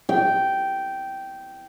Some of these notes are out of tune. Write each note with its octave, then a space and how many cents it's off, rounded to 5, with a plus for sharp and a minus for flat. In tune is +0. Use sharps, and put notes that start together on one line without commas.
G5 -10